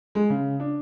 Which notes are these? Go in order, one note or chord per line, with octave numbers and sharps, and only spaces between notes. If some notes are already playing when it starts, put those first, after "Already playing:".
G#3
C#3
D4